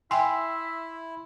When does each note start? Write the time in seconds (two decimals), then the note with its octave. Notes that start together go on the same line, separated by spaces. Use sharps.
0.11 E4 E5 G5 G#5 C6